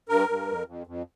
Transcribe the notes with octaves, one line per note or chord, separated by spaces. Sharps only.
G2 A#4
G2
F2
F2
F2